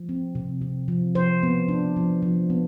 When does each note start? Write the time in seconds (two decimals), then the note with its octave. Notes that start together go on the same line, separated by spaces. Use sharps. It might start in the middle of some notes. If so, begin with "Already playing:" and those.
Already playing: F3
0.09 C4
0.35 C3
0.61 C3
0.88 F3
1.15 F3 C5
1.43 B3
1.68 D4
1.96 F3
2.22 F3
2.50 B3